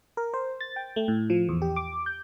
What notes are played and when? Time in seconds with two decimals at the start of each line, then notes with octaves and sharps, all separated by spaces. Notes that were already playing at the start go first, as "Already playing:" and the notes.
0.17 A#4
0.34 C5
0.61 A6
0.76 G5
0.96 A3
1.08 A2
1.30 F3
1.49 E2
1.62 G4
1.76 D6
2.06 G6